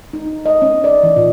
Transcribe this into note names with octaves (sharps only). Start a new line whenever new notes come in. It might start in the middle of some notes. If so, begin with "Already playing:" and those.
D#4
D#5
C#4
D5
E3
A#2